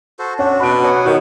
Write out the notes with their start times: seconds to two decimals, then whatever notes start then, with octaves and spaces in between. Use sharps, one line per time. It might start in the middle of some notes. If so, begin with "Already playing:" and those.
0.19 F#4 A4 C5
0.39 C#4 D4 F#4 F#5 A5
0.60 B2 B5 F#6 D7
0.83 F#3 B3 F#5 G#5
1.05 C2 D#3 F#3 F#4